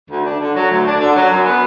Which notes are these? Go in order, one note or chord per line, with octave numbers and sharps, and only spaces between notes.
D2
D4
D3
F#3
D2
D4
D3
F#3
F#2
B3